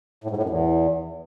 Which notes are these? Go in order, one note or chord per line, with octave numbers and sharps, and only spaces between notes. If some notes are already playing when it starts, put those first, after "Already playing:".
A2
G#2
A2
F#2
E2